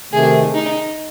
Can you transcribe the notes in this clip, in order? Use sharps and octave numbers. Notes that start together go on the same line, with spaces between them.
C3 D#3 A3 G#4
D#4